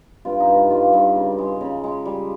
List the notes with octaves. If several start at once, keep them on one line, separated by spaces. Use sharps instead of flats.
G2 F4
D#4
G2
F4
G3 F4
G2
C#3
G#3
C#3
G#3
G3